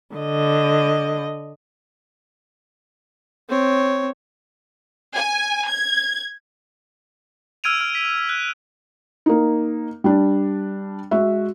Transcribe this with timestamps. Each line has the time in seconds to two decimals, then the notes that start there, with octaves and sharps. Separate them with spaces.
0.16 D3 D#5
3.49 C4 C#5
5.15 G#5
5.68 G#6
7.64 E6 F6 G#6 D7 D#7 F7
7.80 F6 D7
7.95 B6
8.29 F#6
9.26 A#3 D#4
10.04 G3 D4
11.11 G#3 F#4 E5